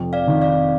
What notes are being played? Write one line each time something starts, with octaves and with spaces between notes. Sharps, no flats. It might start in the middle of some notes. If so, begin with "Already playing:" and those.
Already playing: F1 F2
D5 F5
D#3
D5 F5